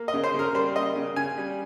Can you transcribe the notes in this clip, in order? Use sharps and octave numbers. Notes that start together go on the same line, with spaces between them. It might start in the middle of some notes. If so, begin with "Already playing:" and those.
Already playing: A#3
D#5
C#3
C5
C#3 A#4
G3 C5
A#3 D#5
C#3
C#3 G#5
G3